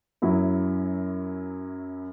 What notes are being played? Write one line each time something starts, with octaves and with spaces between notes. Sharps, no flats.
F#2 F#3 E4